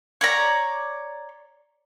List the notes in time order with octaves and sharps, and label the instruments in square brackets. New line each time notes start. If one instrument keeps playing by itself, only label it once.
[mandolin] C#5 D5 A#5